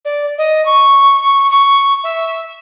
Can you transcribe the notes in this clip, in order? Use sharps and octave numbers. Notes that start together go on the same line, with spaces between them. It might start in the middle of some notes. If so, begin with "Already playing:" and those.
D5
D#5
C#6
C#6
E5